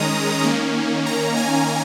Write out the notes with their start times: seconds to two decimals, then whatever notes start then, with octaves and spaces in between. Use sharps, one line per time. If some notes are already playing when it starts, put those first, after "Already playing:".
Already playing: D#3 G#3 C#4 A#5 D#6
0.44 D#3 A#3 C#4
1.06 A#5
1.36 G#5